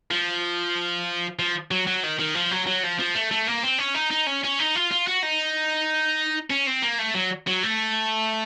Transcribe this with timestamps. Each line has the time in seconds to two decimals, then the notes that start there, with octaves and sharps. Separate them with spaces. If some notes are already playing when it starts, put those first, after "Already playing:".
0.11 F3
1.39 F3
1.71 F#3
1.87 F#3
2.03 D#3
2.19 D#3
2.35 F3
2.51 F#3
2.67 F#3
2.84 F3
2.99 F3
3.15 A3
3.31 A3
3.47 A#3
3.63 C4
3.78 C#4
3.95 D#4
4.11 D#4
4.27 C#4
4.44 C#4
4.59 D#4
4.75 F4
4.91 F4
5.07 F#4
5.23 D#4
6.50 C#4
6.67 C4
6.82 A#3
6.99 A3
7.14 F#3
7.47 F#3
7.63 A3